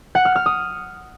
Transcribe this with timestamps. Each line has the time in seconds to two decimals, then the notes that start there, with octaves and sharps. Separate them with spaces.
0.15 F#5
0.25 F6
0.36 F6
0.46 D#6